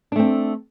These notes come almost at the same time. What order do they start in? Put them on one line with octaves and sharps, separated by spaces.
D4 A3 C4